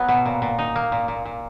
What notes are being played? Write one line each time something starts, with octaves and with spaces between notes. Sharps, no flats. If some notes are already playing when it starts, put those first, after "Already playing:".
Already playing: F#3 B3
B2
A#2
A#2
D#4
A#3
A#2
A#2
A#2